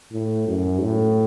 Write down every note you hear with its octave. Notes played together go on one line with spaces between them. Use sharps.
A2
F#2
A2